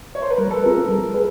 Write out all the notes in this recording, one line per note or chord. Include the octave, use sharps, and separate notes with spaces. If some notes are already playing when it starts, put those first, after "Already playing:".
C#5
C5
B4
G3 A#4
A4 B4
C4 F4 G#4 A#4 B4
A#4
G3 A#4
G#4 B4